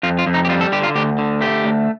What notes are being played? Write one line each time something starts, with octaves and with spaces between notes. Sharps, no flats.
F2 F4
F4
F2
D#4
G4
G3 F4
A4
D3 G4
F4
D2 G4
D3
A3 G4
D2